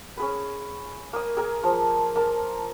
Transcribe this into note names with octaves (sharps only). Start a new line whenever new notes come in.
C#4 G#4 B4
A#3 D#6
G#4 A#4 G#5
F3
A#3 A#4 A5